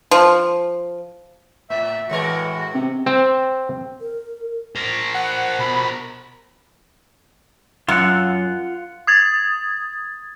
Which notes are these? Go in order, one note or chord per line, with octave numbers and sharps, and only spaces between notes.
F3
A2 E5
A2 E3 G#3 F#4 A#4
C3
C4
A#4
A#4 C5
F#5
B2 B5
F#2 F4 F#5
D#6 G#6 A6